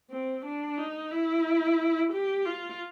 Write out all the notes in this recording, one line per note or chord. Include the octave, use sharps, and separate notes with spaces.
C4
D4
D#4
E4
G4
F4